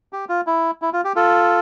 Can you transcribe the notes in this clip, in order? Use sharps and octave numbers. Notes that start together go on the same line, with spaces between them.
G4
F4
E4
E4
F4
G4
F4 A4